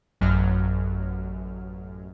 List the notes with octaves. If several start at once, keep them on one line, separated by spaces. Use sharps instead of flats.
A1 F#2 F#3 F6